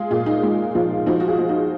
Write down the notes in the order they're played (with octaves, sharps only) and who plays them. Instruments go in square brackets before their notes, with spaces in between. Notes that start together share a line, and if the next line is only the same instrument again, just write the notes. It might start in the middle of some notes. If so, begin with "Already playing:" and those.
Already playing: [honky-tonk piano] G#3 F4 G#4
A#2 F4 G#4
D#4
G#3 D#4
F3 F4
F3 D#4 F#4
F#4
F4 G#4
F3
D#4 F#4